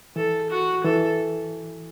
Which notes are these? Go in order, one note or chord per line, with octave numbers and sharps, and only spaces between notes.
E3 A4
F#4
E3 A4